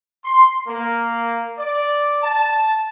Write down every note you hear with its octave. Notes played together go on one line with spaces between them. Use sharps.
C6
A#3
D5
A5